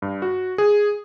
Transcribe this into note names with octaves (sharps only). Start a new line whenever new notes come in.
G2
F#4
G#4